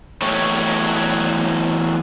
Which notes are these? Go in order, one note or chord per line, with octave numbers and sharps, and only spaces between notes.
E2 F#3 A3 G4 C#5